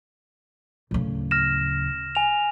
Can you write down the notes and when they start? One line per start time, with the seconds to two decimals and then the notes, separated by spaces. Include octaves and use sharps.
0.91 D1 C#3
1.31 F6 A#6 E7
2.15 G#5 F7